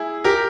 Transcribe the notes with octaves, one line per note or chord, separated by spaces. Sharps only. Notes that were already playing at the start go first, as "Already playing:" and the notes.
Already playing: E4 G#4
G4 A#4